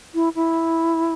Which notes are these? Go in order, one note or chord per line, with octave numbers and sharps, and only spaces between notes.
E4
E4